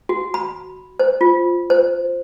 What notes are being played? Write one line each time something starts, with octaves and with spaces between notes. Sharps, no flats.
F#4
B5
C5
F4
C5